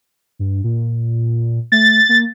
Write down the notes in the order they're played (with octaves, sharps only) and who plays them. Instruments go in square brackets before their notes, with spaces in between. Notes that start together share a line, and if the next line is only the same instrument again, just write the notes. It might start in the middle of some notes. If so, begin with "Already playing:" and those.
[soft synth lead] G2
A#2
[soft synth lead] A3 [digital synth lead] A6
[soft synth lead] A#3